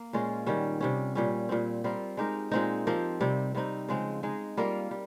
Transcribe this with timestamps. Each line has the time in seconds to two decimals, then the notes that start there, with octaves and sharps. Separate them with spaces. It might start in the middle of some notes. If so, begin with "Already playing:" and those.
Already playing: A#3
0.13 A#2 G#3 C#4 F4
0.46 D#3 G3 C#4
0.80 C3 G3 C#4
1.15 A#2 G3 C#4
1.49 A#2 G3 C4
1.84 G3 C4 F4 A#4
2.17 G#3 D#4 G4 A#4
2.51 A#2 G#3 C4 D#4
2.87 F3 C4 G4 A#4
3.20 C3 G3 C4
3.55 C3 G3 C4 D#4
3.88 C#3 F3 G#3 C4
4.23 G#3 D#4 G#4
4.57 G3 A#3 F4 A#4
4.91 G3